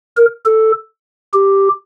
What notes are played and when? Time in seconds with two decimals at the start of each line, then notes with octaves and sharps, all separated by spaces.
0.17 A#4
0.46 A4
1.34 G4